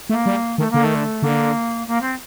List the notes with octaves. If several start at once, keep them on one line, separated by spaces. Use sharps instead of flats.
A3 A#3
G3
D#3 A3
D3 A#3
D#3 A3
D3
D3 A#3
A#3
C4